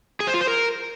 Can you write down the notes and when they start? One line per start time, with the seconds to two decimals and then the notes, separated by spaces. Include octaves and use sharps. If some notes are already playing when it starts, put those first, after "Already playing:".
0.20 G#4
0.27 C5
0.34 F4
0.41 C5
0.48 A#4